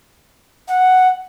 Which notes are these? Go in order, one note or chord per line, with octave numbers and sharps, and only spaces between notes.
F#5